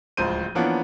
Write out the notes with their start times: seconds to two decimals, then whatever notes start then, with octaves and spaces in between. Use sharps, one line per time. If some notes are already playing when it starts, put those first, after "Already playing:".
0.17 D1 C#2 F3 C5 G6 D#7
0.55 E3 F3 A#3 B3 C#4 D4